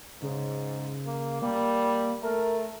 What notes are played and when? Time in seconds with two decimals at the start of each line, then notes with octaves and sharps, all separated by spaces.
0.22 G#2 C#3
1.06 A#3
1.42 G3 A#3
2.22 A3 A#4